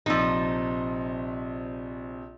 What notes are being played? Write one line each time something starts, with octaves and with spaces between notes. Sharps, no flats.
A#1 C3 F3 D#4 E6